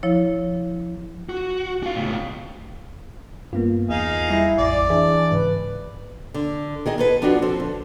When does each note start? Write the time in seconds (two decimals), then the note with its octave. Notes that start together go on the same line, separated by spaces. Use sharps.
0.03 F3 E4 C#5
1.29 F#4
1.83 F#4 F5
1.95 C#2 A2
3.53 G2 A#3 B3 F4
3.90 E2 D#4 G#4 F5
4.29 G3 E4 A#6
4.59 A1 F2 D5
4.90 E3 D4 G#4 E5 G#5
5.32 G#2 C#3 B4
6.34 D3
6.86 D#3 G#4 D#5
6.98 F4 A4 B4
7.22 F3 D4 F4 F#4
7.42 F3 C4 A4
7.60 D3